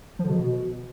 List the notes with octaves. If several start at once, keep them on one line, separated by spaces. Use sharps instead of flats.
F3
D3
B2